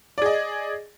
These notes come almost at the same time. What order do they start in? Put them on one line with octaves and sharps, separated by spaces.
D5 G#4 D#5